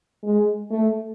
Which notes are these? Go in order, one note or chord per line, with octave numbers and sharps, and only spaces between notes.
G#3
A3